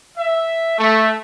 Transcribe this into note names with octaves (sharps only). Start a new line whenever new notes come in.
E5
A3